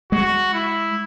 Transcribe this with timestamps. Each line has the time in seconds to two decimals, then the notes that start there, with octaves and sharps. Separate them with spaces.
0.12 G#3 F#4
0.54 E4